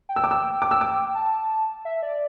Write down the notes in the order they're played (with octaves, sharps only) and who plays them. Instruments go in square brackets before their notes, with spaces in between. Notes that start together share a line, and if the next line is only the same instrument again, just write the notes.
[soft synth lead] G5
[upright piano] E6
D6
E6
D6
E6
D6
[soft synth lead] A5
E5
D5